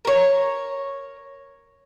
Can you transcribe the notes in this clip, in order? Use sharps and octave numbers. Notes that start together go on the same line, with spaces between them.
A#4 C#5